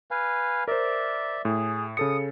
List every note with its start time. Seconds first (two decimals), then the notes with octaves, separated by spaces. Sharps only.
0.11 B4 F5 G#5
0.68 A#4 C5 D5 E5
1.45 A2 G#4
1.97 C#3 A4 D#6 C#7